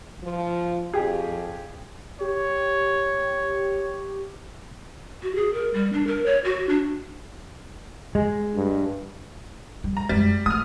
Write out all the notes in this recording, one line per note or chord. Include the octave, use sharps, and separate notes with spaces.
F3
F2 G4 G#4
G4 C#5
F#4
G#4
A#4
G3
D4
A#4
C#5
F#4
D4
G#3
G2
G3
A#5
F#2 G3 G#3
A3 D#6 F6